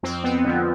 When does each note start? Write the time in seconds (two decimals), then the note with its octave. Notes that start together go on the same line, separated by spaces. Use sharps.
0.03 F2 C4
0.24 B3
0.44 D3 F3